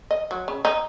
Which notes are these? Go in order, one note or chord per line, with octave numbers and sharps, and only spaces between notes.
D#5
F#3
C#3
D#4